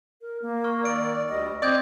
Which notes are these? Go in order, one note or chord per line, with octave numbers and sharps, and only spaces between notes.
A#4
A#3
C#6 F6
D#3 D5 E6 D7
D2 G3 D#5
C4 D5 D#5 D#6 G6 G#6